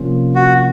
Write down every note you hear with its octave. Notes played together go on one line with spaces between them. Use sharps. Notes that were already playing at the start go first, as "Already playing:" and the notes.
Already playing: C3 F3 A#3 C#4 F4
F#4